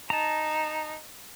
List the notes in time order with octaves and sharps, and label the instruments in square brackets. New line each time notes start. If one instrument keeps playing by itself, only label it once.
[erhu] D#4 [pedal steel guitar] A5 A#5